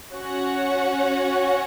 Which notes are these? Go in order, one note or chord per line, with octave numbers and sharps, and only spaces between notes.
C#4 F#4 C#5 F#5